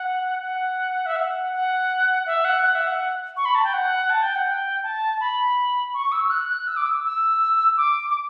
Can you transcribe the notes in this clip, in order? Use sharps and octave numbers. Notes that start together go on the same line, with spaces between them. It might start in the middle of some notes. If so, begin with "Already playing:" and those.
Already playing: F#5
F#5
E5
F#5
F#5
E5
F#5
F#5
E5
F#5
C#6
B5
A5
G5
F#5
A5
G5
F#5
G5
A5
B5
C#6
E6
E6
F#6
F#6
E6
D6
E6
E6
D6
D6